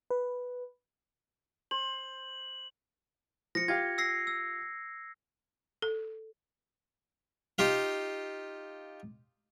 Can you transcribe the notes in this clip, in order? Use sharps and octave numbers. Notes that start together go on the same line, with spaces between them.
B4
C5 F#7
F3 A#6 C#7
F4 G4 F5 G#6
E6 A#6 C7
E6
A4
D#4 F4 G4 F5